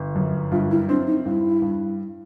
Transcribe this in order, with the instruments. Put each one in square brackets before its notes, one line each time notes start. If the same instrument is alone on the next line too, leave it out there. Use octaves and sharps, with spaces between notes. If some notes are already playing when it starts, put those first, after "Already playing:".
Already playing: [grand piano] G1
F#2
[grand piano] G2 [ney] F4
[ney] E4
[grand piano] C4 [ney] D4
[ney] D#4
[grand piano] G2 [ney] E4
[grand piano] G2